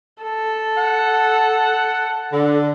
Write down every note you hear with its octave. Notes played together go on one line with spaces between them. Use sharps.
A4
F#5
D3